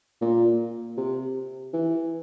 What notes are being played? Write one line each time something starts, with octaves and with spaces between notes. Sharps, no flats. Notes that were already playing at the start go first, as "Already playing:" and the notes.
A#2
C3
E3